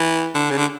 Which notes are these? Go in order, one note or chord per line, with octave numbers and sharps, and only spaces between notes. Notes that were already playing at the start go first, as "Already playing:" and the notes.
Already playing: E3
D3
C#3
D3